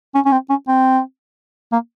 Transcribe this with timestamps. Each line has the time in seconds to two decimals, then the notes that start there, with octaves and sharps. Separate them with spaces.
0.15 C#4
0.25 C#4
0.32 C4
0.50 C#4
0.68 C4
1.72 A#3